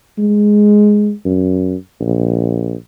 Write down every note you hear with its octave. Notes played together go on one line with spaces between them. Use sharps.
G#3
F#2
A#1